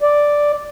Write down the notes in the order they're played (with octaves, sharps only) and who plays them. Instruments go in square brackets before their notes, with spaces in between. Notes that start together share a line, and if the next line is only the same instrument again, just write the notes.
[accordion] D5